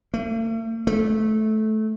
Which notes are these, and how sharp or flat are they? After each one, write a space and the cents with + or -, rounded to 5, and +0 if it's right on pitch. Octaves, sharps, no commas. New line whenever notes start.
A3 +45
A3 -15